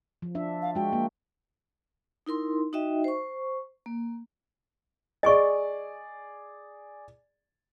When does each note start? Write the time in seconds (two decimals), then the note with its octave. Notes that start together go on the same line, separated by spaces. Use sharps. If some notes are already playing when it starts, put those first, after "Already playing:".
0.22 F3
0.35 D4 E5
0.62 F5
0.75 G#3 F#4 G5
0.93 A#3
2.26 D#4 E4 A#4 C6
2.73 D#4 F#4 D#5 E5 G5
3.04 C5 C#6
3.86 A#3
5.23 G#4 D5 D#5 G#5 C#6